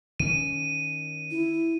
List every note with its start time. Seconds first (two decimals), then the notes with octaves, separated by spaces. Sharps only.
0.20 D#3 C#4 D#7
1.31 E4